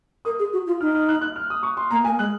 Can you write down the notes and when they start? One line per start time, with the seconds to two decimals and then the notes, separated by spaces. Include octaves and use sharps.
0.25 A#4 D#6
0.39 G#4
0.53 F#4
0.67 F4
0.81 D#4 F6
0.95 F6
1.09 F#6
1.21 F#6
1.36 F6
1.50 D#6
1.63 C#6
1.77 C6
1.91 A#3 A#5
2.04 A#3 G#5
2.19 G#3 F#6